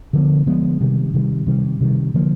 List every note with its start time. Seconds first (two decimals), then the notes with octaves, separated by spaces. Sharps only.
0.13 D3 F3 G#3 B3
0.46 D3 F3 G#3 B3
0.81 C3 D#3 G3
1.14 C3 D#3 G3
1.46 C3 D#3 G3
1.81 C3 D#3 G3
2.14 D3 F3 A#3